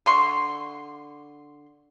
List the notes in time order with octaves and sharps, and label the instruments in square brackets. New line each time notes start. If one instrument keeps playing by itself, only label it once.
[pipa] D3 C6 C#6